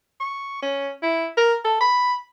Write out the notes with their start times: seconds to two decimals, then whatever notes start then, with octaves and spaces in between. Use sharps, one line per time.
0.20 C#6
0.62 C#4
1.03 E4
1.37 A#4
1.65 A4
1.81 B5